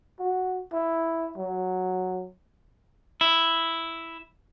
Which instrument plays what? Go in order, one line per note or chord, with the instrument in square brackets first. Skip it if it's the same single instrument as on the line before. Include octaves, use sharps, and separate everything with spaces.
[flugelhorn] F#4
E4
F#3
[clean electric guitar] E4